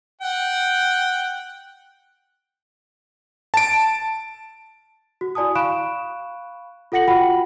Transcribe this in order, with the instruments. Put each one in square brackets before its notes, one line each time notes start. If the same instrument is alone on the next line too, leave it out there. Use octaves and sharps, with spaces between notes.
[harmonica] F#5 G5
[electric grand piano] A5 D7
[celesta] F#4
E4 F#4 D5 G#5 A5 D#6
F5 B5 C#6 F#6 D7 E7
F4 A4 F#5 A#6 C#7 F#7
F4 F#4 F#5 G5 B5